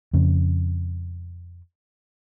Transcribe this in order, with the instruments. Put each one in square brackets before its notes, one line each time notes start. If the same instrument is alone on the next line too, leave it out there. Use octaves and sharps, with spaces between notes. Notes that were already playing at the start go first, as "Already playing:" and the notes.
[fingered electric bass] F2 C#3